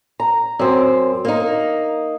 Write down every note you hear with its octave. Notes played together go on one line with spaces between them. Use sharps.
A#5
F#2 C4
A#3 D#4